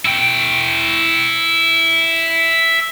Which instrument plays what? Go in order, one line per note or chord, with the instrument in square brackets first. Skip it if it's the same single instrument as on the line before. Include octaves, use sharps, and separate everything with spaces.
[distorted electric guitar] E4 G5